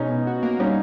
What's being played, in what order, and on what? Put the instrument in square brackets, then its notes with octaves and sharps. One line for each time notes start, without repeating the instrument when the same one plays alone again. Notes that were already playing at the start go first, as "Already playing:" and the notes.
Already playing: [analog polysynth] B2 G#3 [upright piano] C#4 D#4
[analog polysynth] B3
F#4
A#3
[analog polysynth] G3 [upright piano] C#4 D#4